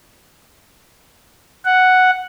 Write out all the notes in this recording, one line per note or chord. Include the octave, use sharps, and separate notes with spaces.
F#5